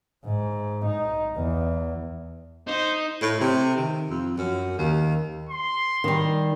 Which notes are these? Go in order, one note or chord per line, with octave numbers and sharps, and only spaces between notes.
G#2
D#4
E2
D#4 C5
A2
C3
D#3
F2
F#2
D#2
C6
D#3 G3